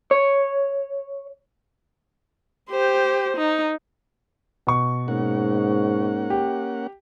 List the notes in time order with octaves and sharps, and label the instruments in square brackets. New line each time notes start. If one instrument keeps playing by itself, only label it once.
[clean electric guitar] C#5
[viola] G4 C5
D#4
[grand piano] B2 C#6
[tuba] G#2 [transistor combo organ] A#3 C#4 F#5
[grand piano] G4